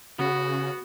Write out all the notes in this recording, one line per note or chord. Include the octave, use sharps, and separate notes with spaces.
C#3 B3 F#4